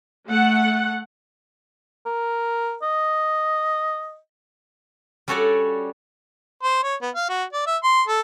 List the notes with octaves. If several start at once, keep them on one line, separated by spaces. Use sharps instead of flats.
A3 F#5
A#4
D#5
G3 C#4 F#4 A4 C#5 D5
C5
C#5
B3
F5
F#4
D5
E5
C6
A4